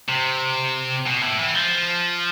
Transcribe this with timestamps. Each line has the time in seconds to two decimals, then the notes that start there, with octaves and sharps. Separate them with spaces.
0.09 C3
1.06 B2
1.22 A2
1.38 E3
1.54 F3